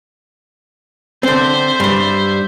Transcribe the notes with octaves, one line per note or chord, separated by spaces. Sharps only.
D3 C4 C5 E5
G2 G3